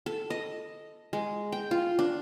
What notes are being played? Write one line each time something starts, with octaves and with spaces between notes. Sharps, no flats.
A4
D#5
G#3
G5
F4
D4